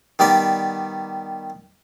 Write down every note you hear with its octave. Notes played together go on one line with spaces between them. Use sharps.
D#3 G3 B3 D5